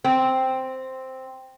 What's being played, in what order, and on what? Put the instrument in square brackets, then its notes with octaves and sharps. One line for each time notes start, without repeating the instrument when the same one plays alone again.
[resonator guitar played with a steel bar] C4